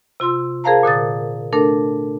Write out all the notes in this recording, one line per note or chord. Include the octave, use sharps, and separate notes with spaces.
C3 F4 C6 E6
G#4 A#4 C5 F5 A5 A#5
A#2 D3 D#6 A6
A3 D4 A4 A#4